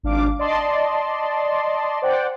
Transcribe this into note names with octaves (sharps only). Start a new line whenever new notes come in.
G#1 D4 F5 D6
D5 D#5 A5 C6
C5 D5 F#5 G5